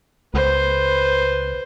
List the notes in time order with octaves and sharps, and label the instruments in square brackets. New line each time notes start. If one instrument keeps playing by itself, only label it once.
[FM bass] C#2 [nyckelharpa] B4 C5